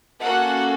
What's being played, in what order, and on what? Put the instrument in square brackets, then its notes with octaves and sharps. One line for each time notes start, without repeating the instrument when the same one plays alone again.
[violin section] A#3 C#4 F#4 A4 F#5